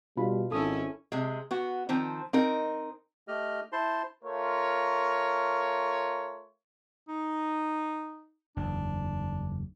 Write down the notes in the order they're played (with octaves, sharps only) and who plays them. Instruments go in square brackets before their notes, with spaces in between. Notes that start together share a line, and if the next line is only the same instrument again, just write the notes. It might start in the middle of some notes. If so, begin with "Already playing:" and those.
[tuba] B2 [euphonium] G3 [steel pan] D4 F4 B5
[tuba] G#1 [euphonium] G#2 [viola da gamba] C#4 E4 [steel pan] A4 D#6
[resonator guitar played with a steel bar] C3 G#3
B3 F#4
D#3 F3 C4
C4 D#4 A#4
[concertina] A3 G4 D#5 F6
E4 C5 A5 C6
[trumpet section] A3 F4 A#4 C#5
[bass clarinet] D#4
[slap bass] F#1 E2 [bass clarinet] D4